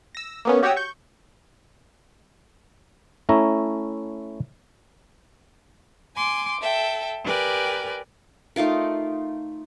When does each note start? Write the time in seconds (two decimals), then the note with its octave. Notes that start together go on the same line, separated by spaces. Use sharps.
0.15 E6 A#6
0.45 A#3 B3 C#4
0.63 F#4 G4 C#5 G5 D#6 E6
0.77 C#6 G6
3.29 A3 C#4 E4 A#5
6.15 G#5 C6 D6
6.61 A4 E5 G5
7.24 G4 A#4 B4 D5 G#5
8.56 A3 D#4 F4 A#4